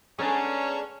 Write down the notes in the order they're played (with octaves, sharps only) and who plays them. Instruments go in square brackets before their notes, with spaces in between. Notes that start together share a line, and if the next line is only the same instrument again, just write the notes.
[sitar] G#3 B3 D4 [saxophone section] C#4 [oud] G#4 [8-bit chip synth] A5 A#5 C#6